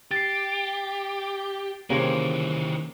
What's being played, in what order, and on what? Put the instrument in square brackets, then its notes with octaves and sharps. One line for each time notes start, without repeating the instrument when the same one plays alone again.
[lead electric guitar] G4 [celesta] A6 C7
[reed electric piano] C3 G4 C5 [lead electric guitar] D#3 E3 [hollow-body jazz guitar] A#3 C#4 G#4